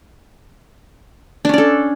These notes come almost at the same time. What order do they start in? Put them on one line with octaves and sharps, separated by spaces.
D4 C#4 D5 A4